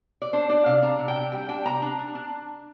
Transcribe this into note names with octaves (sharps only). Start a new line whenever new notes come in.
D5
D4 C5
D4 D5
C3 F5
D4 A#5
C3
G5
C3
G3 G5
D4 G5
C3 A#5
D4
D4
D4